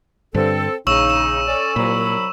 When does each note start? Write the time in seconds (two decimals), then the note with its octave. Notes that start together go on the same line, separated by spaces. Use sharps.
0.35 G2 D3 C4 A4
0.87 A#1 C#3 D#4 C#6 E6 E7
1.10 E7
1.47 C#4 A4 D5
1.76 C2 A#2 F#3 B5